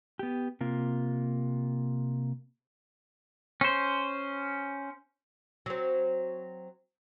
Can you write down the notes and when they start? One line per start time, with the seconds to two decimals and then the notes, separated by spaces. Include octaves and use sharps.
0.19 B3 G4
0.61 C3 A#3 F4
3.61 C#4 C5
5.66 F#3 C4